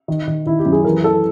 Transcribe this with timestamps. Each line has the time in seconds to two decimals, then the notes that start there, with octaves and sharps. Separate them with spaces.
0.08 D#3
0.27 D#3
0.46 D#3 E4
0.59 G4
0.66 F#2
0.72 G#4
0.84 E3 A#4
1.04 E3 A4